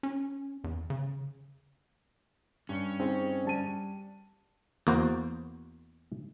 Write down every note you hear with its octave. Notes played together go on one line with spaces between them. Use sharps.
C#4
E2
C#3
G2 C#4
C4 D#4 G#4
G3 A5 D#7
E2 A#3 F#4 C5